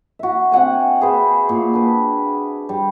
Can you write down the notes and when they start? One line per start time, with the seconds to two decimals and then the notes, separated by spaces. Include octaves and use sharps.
0.19 F#4 E5
0.52 C4 F#4 F#5 G#5
1.01 G#4 B4 C5
1.49 A#2
1.73 D4 B4
2.69 G3